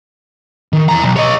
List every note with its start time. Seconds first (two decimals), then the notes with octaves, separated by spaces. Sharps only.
0.73 D#3
0.89 E2 A#5
1.04 B1
1.16 C#5 D#5